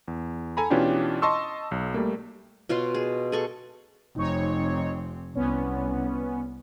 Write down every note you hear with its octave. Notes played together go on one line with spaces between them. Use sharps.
E2
A4 G#5 A#5 B5
B2 E3 C#4 D4 F4 G4
D#5 A5 C6 C#6 E6
B1
G3 A3 A#3
B2 F4 C#5 C6
G#4
G#4 A4 C#6
F1 C4 D#4 C#5
C2 B3 C#4